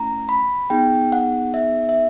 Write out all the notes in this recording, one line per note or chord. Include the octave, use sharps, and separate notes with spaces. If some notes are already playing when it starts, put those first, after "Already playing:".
Already playing: A3 C#4 E4 A#5
B5
B3 D#4 G#4 G5
F#5
E5
E5